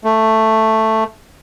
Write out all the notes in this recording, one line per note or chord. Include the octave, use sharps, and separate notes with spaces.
A3